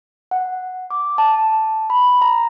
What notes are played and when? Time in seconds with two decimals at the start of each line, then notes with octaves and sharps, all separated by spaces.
0.31 F#5
0.90 D6
1.18 A5
1.90 B5
2.22 A#5